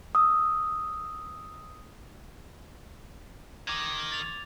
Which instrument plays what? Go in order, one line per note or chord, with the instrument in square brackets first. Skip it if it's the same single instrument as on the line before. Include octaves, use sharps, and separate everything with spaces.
[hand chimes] D#6 E6
[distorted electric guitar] D#3 [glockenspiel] D6 G#6
[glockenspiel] A6 F7